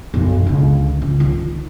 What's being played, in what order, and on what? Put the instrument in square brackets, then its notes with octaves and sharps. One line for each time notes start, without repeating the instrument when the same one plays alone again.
[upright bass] B1 F#2
C#2 D3
C#2
D#3 F4